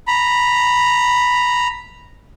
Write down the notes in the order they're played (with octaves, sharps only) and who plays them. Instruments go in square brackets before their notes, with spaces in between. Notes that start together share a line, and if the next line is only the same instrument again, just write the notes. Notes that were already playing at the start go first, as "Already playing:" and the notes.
[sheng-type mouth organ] A#5 B5